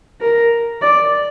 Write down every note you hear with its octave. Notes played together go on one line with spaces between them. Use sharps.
A#4
D5